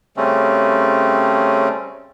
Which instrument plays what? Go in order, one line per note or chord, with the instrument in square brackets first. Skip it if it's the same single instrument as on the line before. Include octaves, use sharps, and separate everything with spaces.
[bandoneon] C#3 G3 A3 C4 C#4